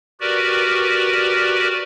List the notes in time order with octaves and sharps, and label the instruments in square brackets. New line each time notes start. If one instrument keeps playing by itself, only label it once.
[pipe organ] F#4 G4 A#4 B4 D5